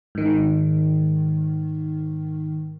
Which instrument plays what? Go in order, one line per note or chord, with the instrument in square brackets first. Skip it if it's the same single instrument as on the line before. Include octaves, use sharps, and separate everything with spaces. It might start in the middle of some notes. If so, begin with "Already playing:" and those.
[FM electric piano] G#2 D#3